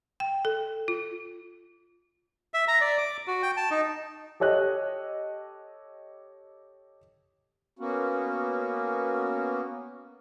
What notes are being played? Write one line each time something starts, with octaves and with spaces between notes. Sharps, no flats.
G5
A4
F4
E5
A#5
D5
D6
F#4
G5
A5
D#4
G4 A4 C#5 D#5 F#6
A#3 B3 C#4 F#4